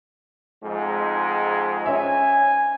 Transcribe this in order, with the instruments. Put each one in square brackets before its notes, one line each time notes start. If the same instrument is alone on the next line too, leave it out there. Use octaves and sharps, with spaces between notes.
[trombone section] F2 G#2 G#3
[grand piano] C#4 E5 [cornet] G#5